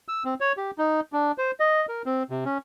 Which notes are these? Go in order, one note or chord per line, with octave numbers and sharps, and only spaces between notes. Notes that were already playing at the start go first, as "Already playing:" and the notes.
E6
C4
C#5
G4
D#4
D4
C5
D#5
A#4
C4
C3
C#4